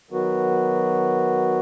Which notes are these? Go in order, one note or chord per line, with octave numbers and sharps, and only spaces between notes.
D#3 F#3 B3 F#4